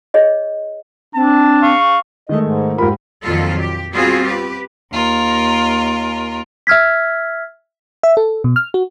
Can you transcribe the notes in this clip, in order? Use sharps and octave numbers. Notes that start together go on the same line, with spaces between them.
G#4 C#5 D#5
C4 D4 A5
F5 C#6
D#3 G#3 A3 D#5
G#2
G#2 F4 G4 A#4 B5
F2 A#2 D#3 F#3 F4 A4
G4
G3 B3 C4 F4 F#4 G#4
G4 B4
D#2 F4 A#4
E5 E6 F6 G#6 B6
E5
A4
B2
F6
F#4